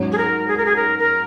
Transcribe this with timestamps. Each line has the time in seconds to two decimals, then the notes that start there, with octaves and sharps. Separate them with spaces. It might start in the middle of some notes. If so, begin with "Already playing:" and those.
Already playing: G#2 F#3 C#4 F#4
0.12 G#4
0.18 A#4
0.48 G#4
0.57 A#4
0.66 G#4
0.76 A#4
0.99 A#4